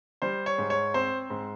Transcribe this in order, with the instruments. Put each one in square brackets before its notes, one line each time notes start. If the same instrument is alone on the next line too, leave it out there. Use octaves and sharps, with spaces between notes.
[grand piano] G3 C5
C#5
G#2
C#5
C4 C5
G#2